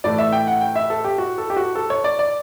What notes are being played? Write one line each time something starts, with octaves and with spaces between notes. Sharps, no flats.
A2 E3 A3 D5
E5
G5
F#5
G5
E5
A4
G4
F#4
A4
G4
F#4
A4
C#5
D5
D5